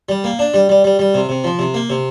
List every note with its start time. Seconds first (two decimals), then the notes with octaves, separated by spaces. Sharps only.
0.09 G3
0.24 A#3
0.39 D4
0.54 G3
0.69 G3
0.84 G3
0.99 G3
1.14 C3
1.29 C3
1.44 F3
1.59 C3
1.74 A#3
1.90 C3